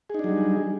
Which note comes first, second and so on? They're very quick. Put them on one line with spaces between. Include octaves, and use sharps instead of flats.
G#4 D#4 D4 F#3 G3